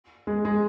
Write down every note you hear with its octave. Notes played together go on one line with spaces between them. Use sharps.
G#3
G#3